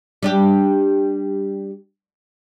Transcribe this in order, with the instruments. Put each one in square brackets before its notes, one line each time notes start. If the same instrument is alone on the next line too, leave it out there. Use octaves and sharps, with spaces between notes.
[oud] G3 D4 G4